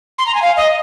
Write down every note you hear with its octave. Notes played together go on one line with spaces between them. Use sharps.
C6
A#5
G#5
F5
D#5